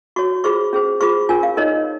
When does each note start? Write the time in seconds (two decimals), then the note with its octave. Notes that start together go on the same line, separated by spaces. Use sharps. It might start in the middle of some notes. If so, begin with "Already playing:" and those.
0.16 F#4 C#5 C#6
0.44 F4 G#4 C5 C#6
0.73 C#4 G#4 C5
1.01 F4 G#4 C5 C#6
1.29 C#4 F4 A#4 G#5
1.43 F5
1.57 D#4 A#4 C#5 D#5